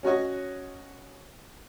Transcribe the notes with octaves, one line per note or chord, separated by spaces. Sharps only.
C#4 F#4 C#5 D#5